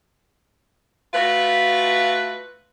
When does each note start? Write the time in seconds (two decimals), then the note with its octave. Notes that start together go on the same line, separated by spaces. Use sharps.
1.14 A3 F4 F#4 B4